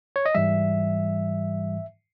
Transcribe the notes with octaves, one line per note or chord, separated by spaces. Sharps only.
C#5
D#5
G#2 E3 G3 E5